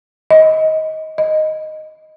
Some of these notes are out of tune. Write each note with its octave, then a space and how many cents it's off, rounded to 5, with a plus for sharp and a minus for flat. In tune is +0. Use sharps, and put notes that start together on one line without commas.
D#5 +20
D#5 +0